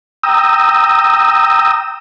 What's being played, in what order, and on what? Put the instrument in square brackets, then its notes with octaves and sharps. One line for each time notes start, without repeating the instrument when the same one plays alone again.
[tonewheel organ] G5 A#5 D#6 E6